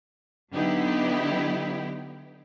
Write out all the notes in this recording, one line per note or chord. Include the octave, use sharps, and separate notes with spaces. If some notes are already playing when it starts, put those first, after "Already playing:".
D3 F#3 B3 D#4 E4 G4